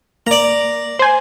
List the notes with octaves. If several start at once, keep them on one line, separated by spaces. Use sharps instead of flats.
A#3 D5 A#5
C5 G#5